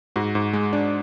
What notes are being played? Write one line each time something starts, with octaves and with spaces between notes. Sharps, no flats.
G#2 F#4
G#2
G#3
D4